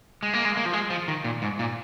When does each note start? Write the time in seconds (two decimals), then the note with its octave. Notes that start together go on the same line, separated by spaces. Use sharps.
0.23 G#3
0.33 A#3
0.45 G#3
0.57 A#3
0.65 F3
0.73 G#3
0.90 F3
1.08 D#3
1.24 A#2
1.42 G#2
1.59 A#2